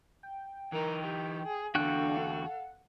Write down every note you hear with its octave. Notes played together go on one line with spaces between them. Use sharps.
G5
E3 D#4 A#4
G4
G#4
E2 D3 D4 F#4 A4 F5 G5 F#6
F#5